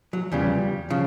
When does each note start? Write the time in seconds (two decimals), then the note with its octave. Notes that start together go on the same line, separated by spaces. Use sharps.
0.13 F#3
0.32 E2 C#3 F3 G3
0.90 C#3 F3